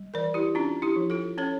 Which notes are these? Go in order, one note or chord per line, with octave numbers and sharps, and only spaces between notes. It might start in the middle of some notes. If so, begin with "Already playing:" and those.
Already playing: G3
E3 A#4 D5
E4 G4
C#4 D4 F4
E4 G4
F3
F4 A4
C#4 A4 C#5